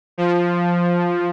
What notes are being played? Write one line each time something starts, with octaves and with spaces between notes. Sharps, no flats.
F3